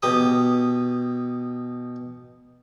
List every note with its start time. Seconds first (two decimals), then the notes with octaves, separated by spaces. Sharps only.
0.03 B2 G4 D#6